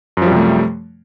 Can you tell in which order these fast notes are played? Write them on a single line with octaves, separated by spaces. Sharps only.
F#2 F3 G3 C3 A3